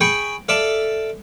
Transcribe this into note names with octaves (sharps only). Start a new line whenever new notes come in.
G#4 G5 G#5 B5 C#6
A4 D5 E5 F5 A5